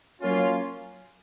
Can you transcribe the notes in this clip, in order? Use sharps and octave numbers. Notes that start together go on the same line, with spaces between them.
F#3 A#3 C#4 F4